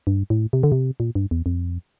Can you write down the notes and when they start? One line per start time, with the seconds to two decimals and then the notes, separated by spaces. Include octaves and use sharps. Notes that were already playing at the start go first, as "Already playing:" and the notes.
0.07 G2
0.30 A2
0.53 C3
0.63 D3
0.72 C3
1.00 A#2
1.15 G2
1.31 E2
1.46 F2